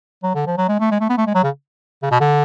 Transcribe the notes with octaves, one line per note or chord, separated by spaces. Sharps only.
F#3
D3
F3
F#3
G#3
A3
G#3
A3
B3
A3
G#3
F#3
C#3
C#3
B2
D3